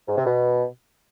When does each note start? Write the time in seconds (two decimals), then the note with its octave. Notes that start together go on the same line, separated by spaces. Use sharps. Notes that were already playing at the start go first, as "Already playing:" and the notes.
0.08 G#2
0.17 C3
0.26 B2